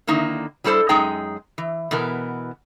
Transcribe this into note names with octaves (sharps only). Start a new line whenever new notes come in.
D3 D#3 A#3 D#4 E4
F#3 G3 E4 A4 C5
F#2 G#3 D#4 G#4 G5 A#5
E3
B2 E3 B3 A#4